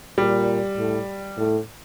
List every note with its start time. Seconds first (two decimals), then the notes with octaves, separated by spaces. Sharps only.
0.18 A#2 G3
0.78 A2
1.37 A2